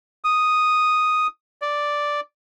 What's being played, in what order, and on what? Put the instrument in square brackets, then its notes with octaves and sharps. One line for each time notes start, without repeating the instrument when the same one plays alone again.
[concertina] D#6
D5